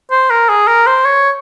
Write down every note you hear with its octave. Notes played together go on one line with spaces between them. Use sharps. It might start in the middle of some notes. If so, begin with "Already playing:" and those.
C5
A#4
G#4
A#4
C5
C#5